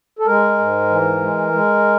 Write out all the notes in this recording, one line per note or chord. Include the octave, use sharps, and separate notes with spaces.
A4
G#3 A#4
G#2
E3
G#3
G#3